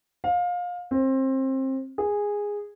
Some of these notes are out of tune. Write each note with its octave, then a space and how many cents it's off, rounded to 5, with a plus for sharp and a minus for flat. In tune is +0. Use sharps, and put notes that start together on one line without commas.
F5 +25
C4 +25
G#4 -10